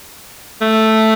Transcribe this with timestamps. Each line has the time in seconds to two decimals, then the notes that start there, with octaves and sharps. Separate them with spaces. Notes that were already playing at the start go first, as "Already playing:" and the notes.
0.61 A3